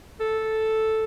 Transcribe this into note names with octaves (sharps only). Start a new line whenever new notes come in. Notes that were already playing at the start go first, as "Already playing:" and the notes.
A4